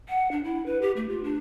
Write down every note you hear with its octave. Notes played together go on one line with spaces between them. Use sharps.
F#5
D4
E4
B4
G4
A3
F4
D4